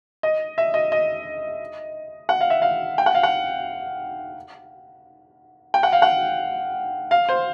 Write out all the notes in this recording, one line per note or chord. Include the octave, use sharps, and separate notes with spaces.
D#5
E5
D#5
D#5
F#5
F5
E5
F5
G5
F#5
F5
F#5
G5
F#5
F5
F#5
F5
C5